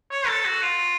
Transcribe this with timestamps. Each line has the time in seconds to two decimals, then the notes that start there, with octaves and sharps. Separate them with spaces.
0.11 C#5
0.28 A4
0.45 F#4
0.62 F4